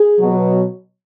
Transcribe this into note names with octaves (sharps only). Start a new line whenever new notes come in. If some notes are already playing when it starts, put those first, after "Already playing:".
Already playing: G#4
B2 F#3